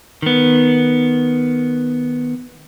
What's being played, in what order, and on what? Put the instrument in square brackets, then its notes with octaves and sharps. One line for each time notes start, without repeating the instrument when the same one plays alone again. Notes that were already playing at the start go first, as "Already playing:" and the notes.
[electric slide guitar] D#3 B3